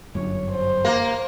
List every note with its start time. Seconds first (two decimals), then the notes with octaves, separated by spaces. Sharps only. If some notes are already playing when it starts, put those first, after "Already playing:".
0.15 G1 F#2 C#5
0.51 C5
0.85 A#3